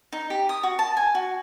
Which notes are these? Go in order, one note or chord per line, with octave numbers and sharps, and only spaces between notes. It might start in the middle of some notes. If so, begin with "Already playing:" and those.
D#4
G4
D#6
F#4
A5
G#5
F#4